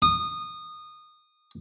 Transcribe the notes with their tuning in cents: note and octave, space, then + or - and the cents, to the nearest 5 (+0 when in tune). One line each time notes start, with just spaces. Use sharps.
D#6 -20